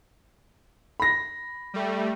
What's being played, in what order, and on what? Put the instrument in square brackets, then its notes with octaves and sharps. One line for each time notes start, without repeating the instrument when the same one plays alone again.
[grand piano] B5 A#6
[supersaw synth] G3 A3